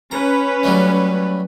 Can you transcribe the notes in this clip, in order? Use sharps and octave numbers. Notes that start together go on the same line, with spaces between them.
C#4 B4 A#5
F#3 G3 A3